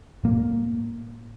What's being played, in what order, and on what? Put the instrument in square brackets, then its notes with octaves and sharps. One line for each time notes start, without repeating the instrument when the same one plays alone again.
[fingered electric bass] A2 A#3